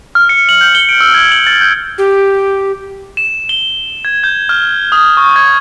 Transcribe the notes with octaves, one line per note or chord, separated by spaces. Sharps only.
F6
C#7
F#7
G6
G7
D7
E6
G#6
F#7
A6
G6
G4
E7
G7
G#6
G6
F6
D#6
C#6
G#6